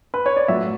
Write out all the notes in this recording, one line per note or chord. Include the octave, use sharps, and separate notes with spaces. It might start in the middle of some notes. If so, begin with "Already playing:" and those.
B4
C#5
D5
A2 F#3 A3 E5